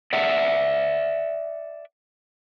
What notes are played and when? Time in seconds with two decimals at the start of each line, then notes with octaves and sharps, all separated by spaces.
0.13 D5 E5 F#5